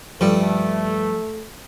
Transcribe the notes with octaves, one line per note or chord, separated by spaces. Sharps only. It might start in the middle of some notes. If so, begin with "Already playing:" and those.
G2 F3 G3 A3 A4